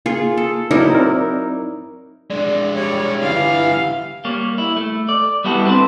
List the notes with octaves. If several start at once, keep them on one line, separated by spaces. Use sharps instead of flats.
A#3 F4 G#4
A4
F#3 D#4 E4 A#4 D5 D#5
C4 A#4 D5
G#3 D4 D5
G3 C#5 D5
D3 E3 G3 F5
G3 A#3 C#5
E4
A3
D5
G3 B3 E4 F#4 G4 A4
C4 D4 B4 C5